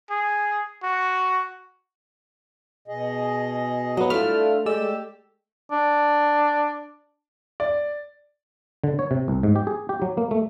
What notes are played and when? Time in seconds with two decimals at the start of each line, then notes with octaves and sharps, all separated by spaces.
0.10 G#4
0.83 F#4
2.88 B2 G#4 D#5
3.97 A2 F3 F#3 B3 D#5
4.10 A3 D4 E4 F4 F6
4.66 G#3 G4 D5 E6
5.71 D4
7.60 D5
8.84 D3
8.99 C#5
9.11 C3
9.28 C2
9.43 G#2
9.56 G4
9.67 G#4
9.89 G4
10.02 F#3
10.17 A#3
10.31 A3